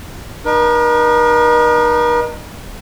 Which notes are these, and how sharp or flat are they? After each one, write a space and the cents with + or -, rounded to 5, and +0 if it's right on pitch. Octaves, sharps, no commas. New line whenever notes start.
D#4 -35 A#4 +45